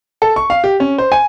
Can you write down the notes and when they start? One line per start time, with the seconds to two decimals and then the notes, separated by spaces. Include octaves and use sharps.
0.22 A4
0.36 C#6
0.50 F5
0.64 G4
0.80 C#4
0.98 C5
1.12 G#5